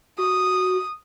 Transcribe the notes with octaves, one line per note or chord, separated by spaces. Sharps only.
F#4 D#6